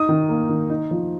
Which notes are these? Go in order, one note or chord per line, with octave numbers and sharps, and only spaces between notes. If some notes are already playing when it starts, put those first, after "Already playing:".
Already playing: D#4 D#6
D#3
A#3
D#3
D#4
F3